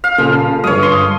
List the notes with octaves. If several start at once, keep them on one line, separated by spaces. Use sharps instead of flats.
F5
A#2 C#3 F3 A4
G2 D3 G#3 C#5 D#6
C6